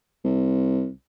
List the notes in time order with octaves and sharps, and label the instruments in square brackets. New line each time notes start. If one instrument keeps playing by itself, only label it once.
[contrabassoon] C2